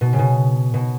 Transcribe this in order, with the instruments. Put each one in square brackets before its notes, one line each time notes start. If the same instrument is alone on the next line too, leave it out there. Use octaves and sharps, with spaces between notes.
[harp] B2
C#3
B2
B2